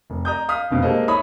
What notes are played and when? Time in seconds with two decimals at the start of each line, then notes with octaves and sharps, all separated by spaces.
0.10 F1
0.25 D5 A#5 D#6 G6
0.48 F5 D#6 F6 B6
0.71 F1 B2 C4 F5
0.83 G#3 A#3 G4 A4 C5 D#5
1.08 D#4 C#5 E5 B5 D#6